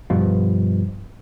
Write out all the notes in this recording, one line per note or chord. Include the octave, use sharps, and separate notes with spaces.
G2 B2 F3